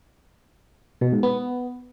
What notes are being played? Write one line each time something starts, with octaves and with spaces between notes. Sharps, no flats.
B2
G#2
B3